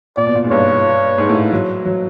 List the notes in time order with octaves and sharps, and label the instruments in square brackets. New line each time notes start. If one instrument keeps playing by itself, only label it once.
[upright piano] A#2 [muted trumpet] D5
[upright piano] B2
A#2
G#2
[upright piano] G2 [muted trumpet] C#5
[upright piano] G#2
A2
F#3
F#3